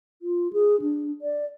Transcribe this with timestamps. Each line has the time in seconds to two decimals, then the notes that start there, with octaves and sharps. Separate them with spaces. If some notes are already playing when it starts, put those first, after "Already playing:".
0.22 F4
0.53 G#4
0.81 D4
1.22 D5